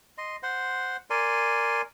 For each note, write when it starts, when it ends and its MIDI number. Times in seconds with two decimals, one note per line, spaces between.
0.18 0.36 75
0.18 0.36 84
0.43 0.97 72
0.43 0.97 78
0.43 0.97 84
1.10 1.82 70
1.10 1.82 74
1.10 1.82 80
1.10 1.82 84